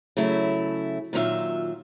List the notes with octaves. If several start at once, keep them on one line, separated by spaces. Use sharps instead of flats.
C#3 F#3 A3 E4
A#2 D#3 F#3 C4 F4 E5